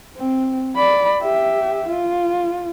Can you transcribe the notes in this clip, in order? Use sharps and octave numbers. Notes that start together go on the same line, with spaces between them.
C4
D5 B5
G4 E5
F4